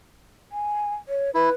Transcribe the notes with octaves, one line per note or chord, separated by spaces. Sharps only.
G#5
C#5
E4 B4